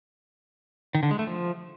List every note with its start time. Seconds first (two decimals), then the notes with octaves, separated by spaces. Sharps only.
0.95 D#3
1.03 D3
1.11 G#3
1.19 A3
1.27 F3